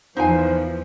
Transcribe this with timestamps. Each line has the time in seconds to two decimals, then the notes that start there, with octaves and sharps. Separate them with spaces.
0.17 E2 E3 F3 D#4 F4 C5 G#5